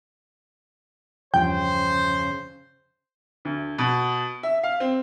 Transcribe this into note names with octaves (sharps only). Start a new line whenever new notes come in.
E2 G2 C#3 F3 C5 G5
D2
B2
E5
F5
C4